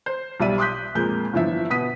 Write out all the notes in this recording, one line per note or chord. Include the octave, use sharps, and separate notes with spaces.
C5
B1 G3 D5 E5 D#7
C6 D6 D#6 F#6 G6 B6
F2 A#2 G#3 A#3 G6
G1 D3 E3 F3 E5
B2 B3 D#6 B6 D#7